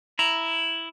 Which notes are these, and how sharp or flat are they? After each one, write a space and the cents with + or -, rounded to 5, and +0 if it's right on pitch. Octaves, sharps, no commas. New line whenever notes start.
E4 +0 A#5 +0